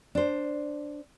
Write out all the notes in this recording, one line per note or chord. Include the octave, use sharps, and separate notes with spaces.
D4 C5